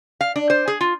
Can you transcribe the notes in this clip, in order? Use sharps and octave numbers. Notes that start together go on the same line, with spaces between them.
F5
D4
C5
G#4
F4